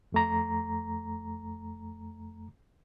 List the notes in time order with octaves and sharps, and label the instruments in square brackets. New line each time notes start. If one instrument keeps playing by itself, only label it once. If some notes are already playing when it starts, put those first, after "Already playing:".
[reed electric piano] F2 A3 A#5